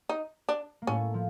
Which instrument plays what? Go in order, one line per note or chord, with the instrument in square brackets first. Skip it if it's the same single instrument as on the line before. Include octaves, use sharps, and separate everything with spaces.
[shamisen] D#4
D4
[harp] A#3
[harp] A2 A3 [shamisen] C#4
[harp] F3